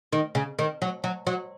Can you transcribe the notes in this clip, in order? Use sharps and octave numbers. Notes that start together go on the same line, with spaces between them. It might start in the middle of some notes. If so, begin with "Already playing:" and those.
D#3
C#3
D#3
F#3
F#3
F#3